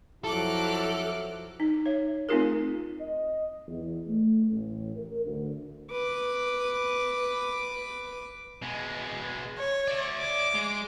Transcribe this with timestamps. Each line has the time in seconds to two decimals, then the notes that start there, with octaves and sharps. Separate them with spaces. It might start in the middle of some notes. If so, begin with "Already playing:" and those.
0.24 F2 F3 F#3 E4 A4 D6 F6 F#6
1.60 D#4
1.86 C#5 E5
2.29 A3 C4 D#4 F4 G#4 A#4
3.00 D#5
3.68 E2
4.08 A3
4.51 A1
4.95 A#4
5.26 D2
5.91 B4 D6
8.62 B2 G#3
9.58 C#5
9.88 D5 E5
10.19 D6
10.54 G#3